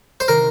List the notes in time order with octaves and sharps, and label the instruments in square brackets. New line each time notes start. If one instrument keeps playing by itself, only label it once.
[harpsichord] C5
[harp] C3 D#3 [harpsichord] A#4